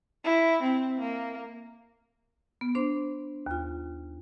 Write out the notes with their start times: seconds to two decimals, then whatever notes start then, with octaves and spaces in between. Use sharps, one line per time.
0.25 E4
0.63 C4
1.00 A#3
2.61 B3
2.75 D4 C5 C6
3.46 D#2 F4